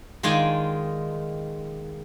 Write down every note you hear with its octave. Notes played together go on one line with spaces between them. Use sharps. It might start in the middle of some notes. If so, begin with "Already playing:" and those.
D#3 G#3 F4 D5 G5 G#5